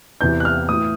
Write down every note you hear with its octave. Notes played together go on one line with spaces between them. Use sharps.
E2 C3 E3 G6
F#6
F6
A2 E3 D#6